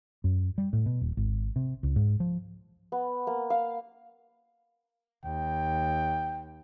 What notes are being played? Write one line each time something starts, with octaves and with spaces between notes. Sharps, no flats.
F#2
G3
A2
B2
D#1
G#1
C3
C#2
G#2
F3
B3
A#3
F5
D#2 G5